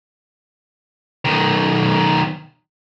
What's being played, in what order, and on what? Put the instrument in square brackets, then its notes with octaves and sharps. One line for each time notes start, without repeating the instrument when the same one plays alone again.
[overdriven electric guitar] B1 D#3